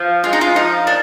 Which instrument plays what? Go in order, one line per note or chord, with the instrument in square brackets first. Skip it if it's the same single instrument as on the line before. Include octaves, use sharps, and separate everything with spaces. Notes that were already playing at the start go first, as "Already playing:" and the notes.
Already playing: [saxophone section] F3
[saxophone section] G#3 [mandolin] F4
[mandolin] D#4
F4
[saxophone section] F3 [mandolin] D#4
[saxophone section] A#2 [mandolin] D4